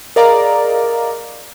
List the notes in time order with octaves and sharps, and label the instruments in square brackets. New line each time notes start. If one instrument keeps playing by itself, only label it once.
[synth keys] G#4 A#4 D5 D#5 F5 A#5